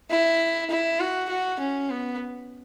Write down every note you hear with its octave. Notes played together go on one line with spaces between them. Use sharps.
E4
E4
F#4
F#4
C#4
B3